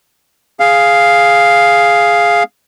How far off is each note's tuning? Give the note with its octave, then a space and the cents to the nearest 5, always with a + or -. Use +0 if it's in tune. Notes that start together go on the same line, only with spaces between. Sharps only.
G#4 +0 F5 +0